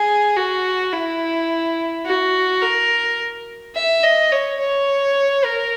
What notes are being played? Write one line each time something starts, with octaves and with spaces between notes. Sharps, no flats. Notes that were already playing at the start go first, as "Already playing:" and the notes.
Already playing: G#4
F#4
E4
F#4
A#4
E5
D#5
C#5
C#5
A#4